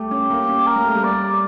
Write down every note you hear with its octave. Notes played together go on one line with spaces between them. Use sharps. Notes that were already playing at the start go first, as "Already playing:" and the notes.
Already playing: G3 A3 G4
C#4
A#3
C#4
A#4
A#3
A3
G3
D5